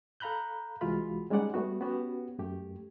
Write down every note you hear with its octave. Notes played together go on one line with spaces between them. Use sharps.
A4 F5 A#5 B5 F#6 G6
C2 E3 G#3 F4 F#4 B5
G3 G#3 C#4 D#4 D5 F#5
G3 A3 B3 F#4
B3 C#4 F#4 G4
F#2 A3 G4